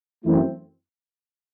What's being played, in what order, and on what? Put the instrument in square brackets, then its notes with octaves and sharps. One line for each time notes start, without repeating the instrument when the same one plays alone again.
[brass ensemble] F#2 E3 A3 C4 E4